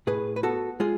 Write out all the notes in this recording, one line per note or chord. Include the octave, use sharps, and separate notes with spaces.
A2 G#4 B4
B4
B3 F#4 A4
G#3 F4 G#4